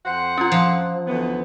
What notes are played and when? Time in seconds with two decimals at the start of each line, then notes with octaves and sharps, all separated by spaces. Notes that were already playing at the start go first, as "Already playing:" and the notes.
0.06 F2 C5 F#5
0.38 C#4 F4
0.52 F3
1.08 D2 E3 B3